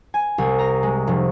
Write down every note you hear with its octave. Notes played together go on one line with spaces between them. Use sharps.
G#5
C2
A#5
G#3
F1